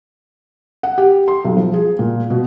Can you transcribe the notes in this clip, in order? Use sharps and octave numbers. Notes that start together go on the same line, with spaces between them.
F#5
G4
C6
B1
F3
G#4
A#2
B2